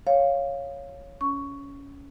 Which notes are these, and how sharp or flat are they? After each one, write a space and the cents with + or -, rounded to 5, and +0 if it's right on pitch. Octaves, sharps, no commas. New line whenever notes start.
C#5 +0 F5 +0
C#4 +15 C#6 +10